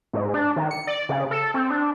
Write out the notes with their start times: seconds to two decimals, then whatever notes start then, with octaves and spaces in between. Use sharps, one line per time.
0.13 G#2
0.34 D4
0.56 D#3
0.71 C#7
0.87 D5
1.09 C#3
1.31 A4
1.54 C4
1.70 D4